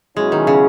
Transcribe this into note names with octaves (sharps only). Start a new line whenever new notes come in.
B2 F#3 G#3 C#4 E4 G#4
D#3
C#3